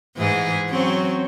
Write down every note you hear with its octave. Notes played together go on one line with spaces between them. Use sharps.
G#2 E3 G#4
F#3 C4 C#4